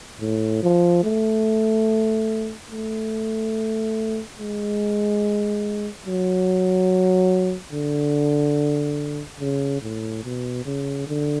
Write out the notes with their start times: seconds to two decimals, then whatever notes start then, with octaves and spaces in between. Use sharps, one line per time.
0.20 A2
0.63 F3
1.04 A3
2.71 A3
4.39 G#3
6.05 F#3
7.73 D3
9.40 C#3
9.82 A2
10.24 B2
10.65 C#3
11.07 D3